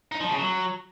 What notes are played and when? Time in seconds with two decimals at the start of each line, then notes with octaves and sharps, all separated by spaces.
0.12 D#4
0.21 F3
0.30 C#3
0.39 F#3